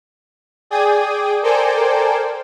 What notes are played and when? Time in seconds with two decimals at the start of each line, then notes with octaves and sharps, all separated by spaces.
0.70 G#4 D5 G5 G#5 D#6
1.42 A4 A#4 C5 D5 G5 G#5